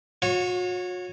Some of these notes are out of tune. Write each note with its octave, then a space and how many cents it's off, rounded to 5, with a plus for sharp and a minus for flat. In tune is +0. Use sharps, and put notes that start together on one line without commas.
F#4 -40 C#5 -10